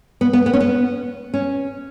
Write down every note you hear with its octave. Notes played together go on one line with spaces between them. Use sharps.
B3
B3
B3
C#4
B3
C#4